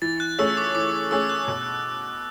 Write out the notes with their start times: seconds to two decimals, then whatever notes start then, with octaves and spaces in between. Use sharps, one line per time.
0.02 E3 A6
0.20 F#6
0.39 A3 C#4 G#4 E6
0.57 D6
0.75 E3 D6
1.11 A3 C#4 G#4 E6
1.25 E6
1.29 F#6
1.48 B2